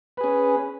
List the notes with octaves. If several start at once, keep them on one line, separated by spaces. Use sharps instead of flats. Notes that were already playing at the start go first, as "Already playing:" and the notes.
C#4 G#4 B4